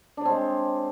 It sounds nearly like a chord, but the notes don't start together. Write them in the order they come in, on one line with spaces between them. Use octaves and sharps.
D4 C#5 C4 G#3